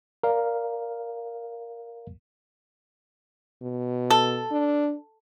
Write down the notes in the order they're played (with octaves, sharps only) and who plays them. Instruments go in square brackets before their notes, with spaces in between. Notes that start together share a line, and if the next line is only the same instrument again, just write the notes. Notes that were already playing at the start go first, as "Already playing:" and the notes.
[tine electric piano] A#4 D5 F5
[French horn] B2
[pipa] A4
[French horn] D4